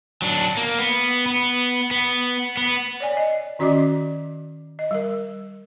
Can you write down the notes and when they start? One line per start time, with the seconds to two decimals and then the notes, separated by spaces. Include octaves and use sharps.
0.22 F#3 D4
0.57 A#3
0.79 B3
1.26 B3
1.91 B3
2.57 B3
3.00 C#5 D5 G#5
3.17 D#5
3.59 D#3 C#4 F#4 D5 D#5 D6
4.79 D#5
4.91 G3 A#4